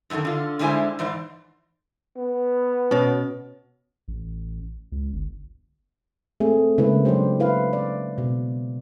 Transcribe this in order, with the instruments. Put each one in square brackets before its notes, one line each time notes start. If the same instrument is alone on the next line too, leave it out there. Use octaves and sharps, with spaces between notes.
[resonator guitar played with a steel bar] F#2 A2 D3 D#3 A4
D3 F4
D3 G3 G#3 E4 C5 G#5
G#2 E3 C5 D5
[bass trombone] B3
[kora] B2 [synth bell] C#4 F#4 C#5
[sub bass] A1
C#2
G1
[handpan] A3 C4 G#4
C#3 G#3 A#3 E4 B4
F#3 D4 G4 C5
E4 B4 F5
D5
B2